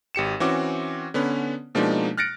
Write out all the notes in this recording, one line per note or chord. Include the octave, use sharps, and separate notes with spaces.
G#1 G4 C#7 E7
E3 C4 C#4 F#4 D6
D3 B3 C#4 B4
B2 F3 G#3 A#3 D4 D#4
F6 F#6 A6 A#6 C#7 D7